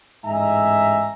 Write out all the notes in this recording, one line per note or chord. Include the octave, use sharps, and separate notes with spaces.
A1 G#2 D#5 E5 G#5 A#5